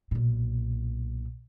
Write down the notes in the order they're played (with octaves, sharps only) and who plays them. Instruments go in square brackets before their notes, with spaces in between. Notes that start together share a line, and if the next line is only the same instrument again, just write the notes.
[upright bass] B1 A#2